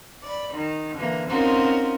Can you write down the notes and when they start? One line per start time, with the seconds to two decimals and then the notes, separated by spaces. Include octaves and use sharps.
0.22 D5 B5
0.52 D#3
0.96 D3 E3 A#3
1.28 C4 C#4 D#4 F4 F#4 A#4